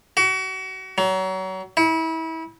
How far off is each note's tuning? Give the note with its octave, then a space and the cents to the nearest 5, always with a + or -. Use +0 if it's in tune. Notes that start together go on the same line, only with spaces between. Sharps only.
F#4 +35
F#3 +30
E4 -30